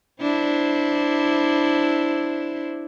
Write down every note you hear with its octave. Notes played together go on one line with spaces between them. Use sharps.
D4 E4 C5